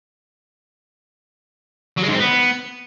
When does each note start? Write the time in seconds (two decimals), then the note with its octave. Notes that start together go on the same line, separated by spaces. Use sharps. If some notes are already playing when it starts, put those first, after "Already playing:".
1.97 F#3
2.03 G#3
2.08 G#2
2.14 C4
2.20 B3